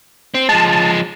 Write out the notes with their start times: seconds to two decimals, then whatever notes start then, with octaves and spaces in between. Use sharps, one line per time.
0.34 C4
0.49 F3 G#3 A5